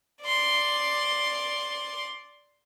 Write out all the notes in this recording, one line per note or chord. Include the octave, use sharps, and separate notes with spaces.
D5 C6